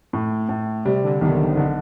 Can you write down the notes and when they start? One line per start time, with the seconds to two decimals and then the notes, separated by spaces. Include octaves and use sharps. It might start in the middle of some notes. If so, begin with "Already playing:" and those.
0.13 A2
0.49 A2
0.85 C3 G3
1.04 D3
1.21 B1 D#3
1.57 D3 D#3